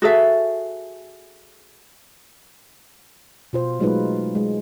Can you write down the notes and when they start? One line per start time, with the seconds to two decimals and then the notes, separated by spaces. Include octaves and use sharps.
0.02 F#4 G#4 A4 E5
3.53 B2 F4 C5
3.80 F#3 G#3 A3 D#4 F4 B4
4.35 G#3